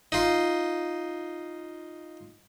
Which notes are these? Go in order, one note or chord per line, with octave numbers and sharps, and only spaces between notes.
D#4 F4